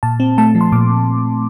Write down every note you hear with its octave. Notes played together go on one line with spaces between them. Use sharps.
A#2 A5
C4
A3 A5
F3
C6
A#2 D6